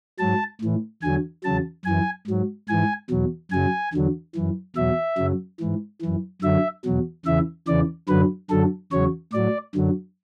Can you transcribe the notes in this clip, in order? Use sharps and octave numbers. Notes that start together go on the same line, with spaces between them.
G#2 F#3 A5
A2 E3
E2 D3 F#3 G#5
E2 C#3 F#3 A5
F#2 E3 G#5
G#2 F#3
G#2 E3 G#5
E2 B2 F#3
F#2 C#3 F#3 G#5
E2 D3 F#3
F#2 E3
E2 B2 F#3 E5
F#2 C#3 F#3
G#2 E3
F#2 E3
F#2 D3 F#3 E5
E2 B2 F#3
E2 C#3 E3 E5
E2 C#3 E3 D5
F#2 D3 F#3 B4
F#2 D3 F#3 A4
E2 C#3 F#3 C#5
A2 F#3 D5
F#2 D3 F#3